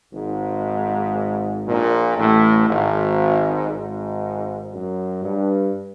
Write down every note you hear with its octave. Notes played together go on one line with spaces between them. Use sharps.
G#1 G#2
A#1 A#2
A1 A2
G#1 G#2
G#1 G#2
F#2
G2